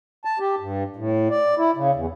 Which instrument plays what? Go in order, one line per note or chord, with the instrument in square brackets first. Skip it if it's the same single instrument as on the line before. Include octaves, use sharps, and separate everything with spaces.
[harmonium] A5
G4
G2
A2
D5
E4
C#3
E2